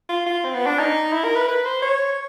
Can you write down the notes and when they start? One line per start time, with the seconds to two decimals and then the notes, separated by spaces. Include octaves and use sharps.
0.09 F4
0.26 F4
0.44 C4
0.55 B3
0.66 D4
0.79 D#4
1.13 E4
1.24 A#4
1.36 B4
1.48 B4
1.65 C5
1.82 C#5